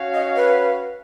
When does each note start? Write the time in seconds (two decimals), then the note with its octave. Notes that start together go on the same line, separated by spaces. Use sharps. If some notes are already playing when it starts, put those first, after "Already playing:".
Already playing: C#4 F#4 C#5 F5
0.14 D#5
0.36 B4